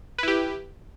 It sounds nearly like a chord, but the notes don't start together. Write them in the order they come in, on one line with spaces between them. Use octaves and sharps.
B4 E4 G4